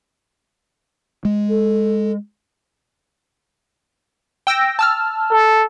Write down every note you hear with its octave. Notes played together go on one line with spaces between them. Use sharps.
G#3
A4
G5 E6 A#6
A5 E6 F6
A4